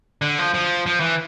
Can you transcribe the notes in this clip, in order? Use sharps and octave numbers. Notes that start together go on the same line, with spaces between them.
D3
F3
F3
F3
E3